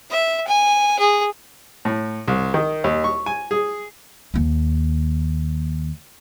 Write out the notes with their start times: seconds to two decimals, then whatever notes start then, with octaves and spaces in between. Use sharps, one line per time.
0.11 E5
0.47 G#5
0.99 G#4
1.85 A2
2.28 C2
2.54 D#3
2.84 D#2
3.04 C#6
3.26 G#5
3.51 G#4
4.34 D#2 A#3